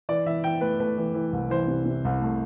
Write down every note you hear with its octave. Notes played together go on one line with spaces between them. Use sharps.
E3 D5
E3 E5
E3 G5
A3 B4
A3 B4
E3
E3
C2
E3 C5
C3
C3
C2
A3